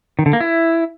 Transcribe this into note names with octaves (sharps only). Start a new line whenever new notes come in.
D#3
D3
A#3
E4